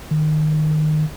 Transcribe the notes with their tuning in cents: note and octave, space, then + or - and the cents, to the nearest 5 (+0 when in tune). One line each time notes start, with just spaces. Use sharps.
D#3 -20